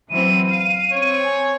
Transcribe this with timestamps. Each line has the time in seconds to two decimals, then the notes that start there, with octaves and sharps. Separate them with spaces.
0.10 E3 F#3 C4 D#7
0.50 F5
0.92 C4 C#5
1.24 G#5